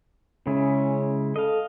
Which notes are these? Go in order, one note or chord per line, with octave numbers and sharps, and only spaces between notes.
C#3 G#3 C#4 E4
A4 D#5 F5